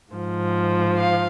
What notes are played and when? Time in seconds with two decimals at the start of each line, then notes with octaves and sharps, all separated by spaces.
0.12 G#2 F3
0.97 F5